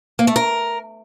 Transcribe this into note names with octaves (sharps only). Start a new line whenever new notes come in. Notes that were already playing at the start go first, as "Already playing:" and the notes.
A#3
A3
A#4